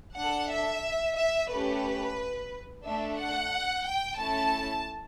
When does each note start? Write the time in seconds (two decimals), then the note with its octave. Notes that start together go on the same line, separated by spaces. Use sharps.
0.15 D4 A4 F#5
0.49 E5
1.16 E5
1.50 A3 C#4 G4 B4
2.85 A3 D4 A4 E5
3.19 F#5
3.86 G5
4.19 A3 C#4 E4 A4 A5